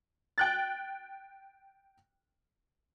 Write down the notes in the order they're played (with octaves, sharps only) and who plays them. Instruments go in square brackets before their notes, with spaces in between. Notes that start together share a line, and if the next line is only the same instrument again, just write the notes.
[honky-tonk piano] G5 F#6 A6